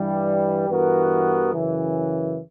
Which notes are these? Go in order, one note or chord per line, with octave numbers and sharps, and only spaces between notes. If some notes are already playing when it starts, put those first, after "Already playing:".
Already playing: G2 E3 G3
G2 E3 B3 F#4 A#4
F#2 C#3 E3